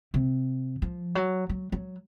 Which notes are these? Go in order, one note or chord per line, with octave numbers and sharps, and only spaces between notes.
C3
F3
F#3
F#3
F#3